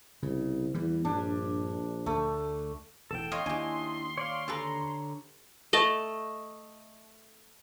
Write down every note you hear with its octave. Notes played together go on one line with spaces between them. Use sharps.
C2 C#3
E2 E3 G3
A#1 G2 D4
D2 A3
E1 E2 A2 A4 G5 E7
C#5 D#5 F5 C6
D#2 D4 E4 G4 D#5 G#5
C#5 D5 F5
D3 G4 A4 B4 C#5 A#5
A3 D#5 A5